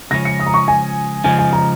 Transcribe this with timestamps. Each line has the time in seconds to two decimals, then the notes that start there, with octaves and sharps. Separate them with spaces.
0.11 C#2 C#3 F3 C#4 A#6
0.25 C#7
0.39 D#6
0.46 A#5
0.54 C#6
0.68 G#5
1.24 C#3 F3 G#3 G#5
1.39 G#5
1.53 A#5